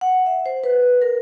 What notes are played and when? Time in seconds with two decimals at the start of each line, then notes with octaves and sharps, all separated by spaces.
0.01 F#5
0.26 E5
0.46 C5
0.64 B4
1.02 A#4